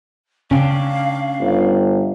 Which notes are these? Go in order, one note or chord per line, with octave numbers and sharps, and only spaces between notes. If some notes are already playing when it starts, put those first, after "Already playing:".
C#3 C#4 D4 F5 G5
G1